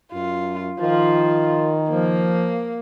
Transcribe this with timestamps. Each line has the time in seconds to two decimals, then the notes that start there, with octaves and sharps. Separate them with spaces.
0.13 F#2 F4
0.80 D#3 F3 F4
1.89 F3 A#3